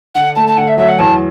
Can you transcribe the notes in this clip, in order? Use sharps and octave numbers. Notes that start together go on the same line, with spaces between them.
D3 F#5
A3 A5
A5
D3 F#5
E5
F#3 E5
F#5
E2 A5